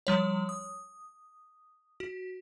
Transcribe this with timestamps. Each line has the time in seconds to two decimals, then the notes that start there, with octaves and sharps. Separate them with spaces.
0.07 F3 G3 C#5
0.49 D#6
2.00 F#4